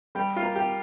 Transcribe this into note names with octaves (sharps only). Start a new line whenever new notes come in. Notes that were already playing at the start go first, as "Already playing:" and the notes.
G3 G4
F4
A#3
G4